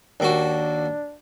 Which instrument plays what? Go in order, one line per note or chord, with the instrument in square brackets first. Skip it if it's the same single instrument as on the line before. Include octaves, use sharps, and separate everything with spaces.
[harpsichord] D#2 A#3 F#4 [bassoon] D4